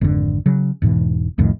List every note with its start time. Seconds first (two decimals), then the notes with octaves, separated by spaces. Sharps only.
0.01 G#1 F2 D3
0.46 C#3 F#3
0.82 E1 G#2 B2 E3
1.38 C2 F2 A2 D#3